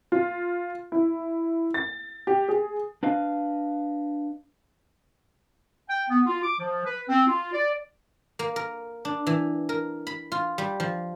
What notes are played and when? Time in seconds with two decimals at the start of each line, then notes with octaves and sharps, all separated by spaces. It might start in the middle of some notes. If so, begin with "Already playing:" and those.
0.12 F4
0.92 E4
1.74 A6
2.27 G4
2.49 G#4
3.03 D4 B4 D#5 F5
5.88 G5
6.10 B3
6.26 F4
6.42 D6
6.59 F3
6.85 B4
7.09 C4
7.27 F4
7.53 D5
8.39 A#3
8.56 A#4
9.05 D4
9.27 E3
9.69 A#4
10.07 B5
10.32 F4
10.58 G3
10.80 F3